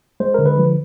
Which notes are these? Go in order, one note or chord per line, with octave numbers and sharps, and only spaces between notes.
G#3 C5
D3 A#4
B4
F3